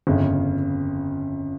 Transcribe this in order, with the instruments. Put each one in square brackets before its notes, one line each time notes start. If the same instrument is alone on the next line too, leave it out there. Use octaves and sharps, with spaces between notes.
[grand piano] G1 F2 C#3